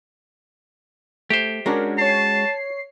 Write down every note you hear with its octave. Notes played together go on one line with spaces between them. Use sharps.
A3 G4 C5
G#3 C#4 D4 F#4 A#4
C#5 A5 C7